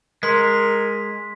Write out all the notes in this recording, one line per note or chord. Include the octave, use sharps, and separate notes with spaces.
G#3 A#4 C6 B6